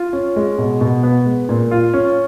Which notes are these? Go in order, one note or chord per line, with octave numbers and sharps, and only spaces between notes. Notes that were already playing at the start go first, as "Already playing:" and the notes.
Already playing: F4
C#4
G#3
B2
B2
B3
G#3
A#2
F4
C#4